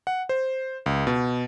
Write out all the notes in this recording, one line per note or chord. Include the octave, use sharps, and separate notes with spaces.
F#5
C5
C#2
B2